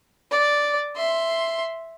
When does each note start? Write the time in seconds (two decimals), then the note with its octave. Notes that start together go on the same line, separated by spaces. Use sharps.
0.31 D5
0.96 E5 C6